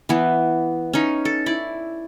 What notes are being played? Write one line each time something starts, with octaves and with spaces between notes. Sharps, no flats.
E3 B3
C#4 D#4
A4
E4 D5